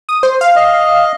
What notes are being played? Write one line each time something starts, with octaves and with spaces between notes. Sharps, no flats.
D#6
C5
F5
D#5